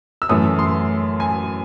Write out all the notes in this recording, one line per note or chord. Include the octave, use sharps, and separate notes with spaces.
E6
F#2 E3 A3 D#6
C6
G#5